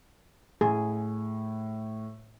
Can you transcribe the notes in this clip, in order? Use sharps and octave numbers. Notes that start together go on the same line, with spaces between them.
A2 G#4